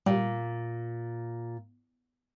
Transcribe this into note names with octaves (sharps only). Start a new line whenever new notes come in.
A#2 G3